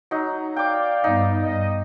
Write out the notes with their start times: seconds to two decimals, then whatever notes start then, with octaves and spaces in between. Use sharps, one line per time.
0.11 F#3 D#4
0.56 D5 F5 G5 D6
1.04 G2 B3 D#4
1.43 G2 D#5